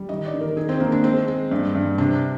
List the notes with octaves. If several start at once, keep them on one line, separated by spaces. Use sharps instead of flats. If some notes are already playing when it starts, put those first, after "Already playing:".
Already playing: G3
D#3 D#5
D5
D#3
A#4
D#3 G#4
C4
D#3 A#3
D4
G#3 C4
G#3
G2
G2
C3 D4